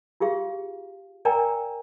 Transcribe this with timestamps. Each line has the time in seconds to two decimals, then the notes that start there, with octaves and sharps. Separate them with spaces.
0.20 F4 G4 G#4 F5
1.25 A#4 D5 G5 G#5 A#5